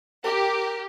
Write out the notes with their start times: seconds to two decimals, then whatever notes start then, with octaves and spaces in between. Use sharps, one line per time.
0.25 G4 A#4